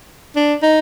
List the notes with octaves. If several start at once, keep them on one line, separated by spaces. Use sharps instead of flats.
D4
D#4